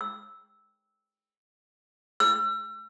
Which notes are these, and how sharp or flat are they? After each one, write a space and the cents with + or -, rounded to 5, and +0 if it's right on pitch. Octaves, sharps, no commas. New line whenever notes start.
E6 -10
E6 +35